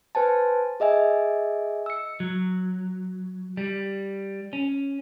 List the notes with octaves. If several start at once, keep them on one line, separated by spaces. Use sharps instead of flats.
B4 C5 G#5 A5
G#4 D#5 E5 G#5
E6 C#7
F#3
G3
C#4